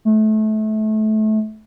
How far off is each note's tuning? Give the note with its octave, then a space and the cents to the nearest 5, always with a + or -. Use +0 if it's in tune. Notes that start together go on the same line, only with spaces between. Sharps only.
A3 -25